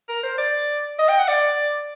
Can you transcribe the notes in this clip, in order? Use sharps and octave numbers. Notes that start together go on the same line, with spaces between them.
A#4
C5
D5
D#5
G5
F#5
D5